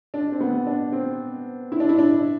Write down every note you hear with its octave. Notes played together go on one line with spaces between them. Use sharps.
D4
C4
B3
D4
C4
E4
D4
E4
D4